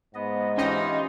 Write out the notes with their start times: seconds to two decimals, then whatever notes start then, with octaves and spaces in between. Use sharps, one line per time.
0.15 G#2 B3 D#5
0.58 E3 C#4 D#4 F4 G4 D#5 C6